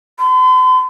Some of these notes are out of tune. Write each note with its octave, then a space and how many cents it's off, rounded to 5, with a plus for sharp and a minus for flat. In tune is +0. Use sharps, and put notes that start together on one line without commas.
C6 -45